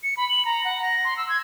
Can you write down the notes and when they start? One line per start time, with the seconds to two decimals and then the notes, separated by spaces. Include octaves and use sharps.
0.03 C#7
0.17 B5
0.29 F#7
0.45 A#5
0.64 F#5
0.82 A#6
1.05 C6
1.17 E6
1.29 G#6